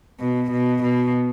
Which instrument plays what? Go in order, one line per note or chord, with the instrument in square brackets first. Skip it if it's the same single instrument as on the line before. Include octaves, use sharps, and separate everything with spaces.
[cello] B2
B2
B2